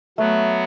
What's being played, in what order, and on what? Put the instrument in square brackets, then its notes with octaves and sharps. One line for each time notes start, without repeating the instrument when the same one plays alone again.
[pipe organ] F#3 B3 F#4 [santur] A3